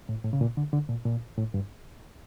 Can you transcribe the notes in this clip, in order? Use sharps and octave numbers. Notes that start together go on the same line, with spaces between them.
A2
A2
C#3
A#2
D3
D3
A#2
A#2
A2
G2